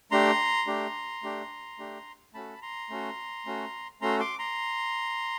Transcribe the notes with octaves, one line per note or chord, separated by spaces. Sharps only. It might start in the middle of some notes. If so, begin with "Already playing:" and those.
A3 D4 G4 A#5 C6
A3 D4 G4
A3 D4 G4
A3 D4 G4
A3 C#4 F#4 A4 A5 B5
A#5 C6
A3 C#4 F#4 A4
A3 C#4 F#4 A4
A3 C#4 F#4 A4 A#5 C6
C6 D6
A#5 C6